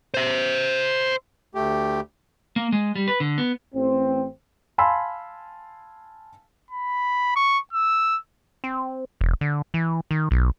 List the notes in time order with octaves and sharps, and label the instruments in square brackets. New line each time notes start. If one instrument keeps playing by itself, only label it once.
[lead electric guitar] C5 E5
[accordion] D2 A3 G4
[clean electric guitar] A#3
G#3
G3
B4
D3
B3
[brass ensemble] A1 C4
[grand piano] F5 G#5 A5 B5 C6 E6
[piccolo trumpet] B5
C#6
E6
[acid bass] C4
E1
D3
E3
D#3
B1